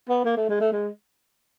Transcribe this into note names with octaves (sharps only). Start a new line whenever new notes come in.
B3
A#3
A3
G#3
A3
G#3